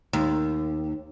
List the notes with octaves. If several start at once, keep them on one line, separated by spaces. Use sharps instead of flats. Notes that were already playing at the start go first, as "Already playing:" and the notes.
D#2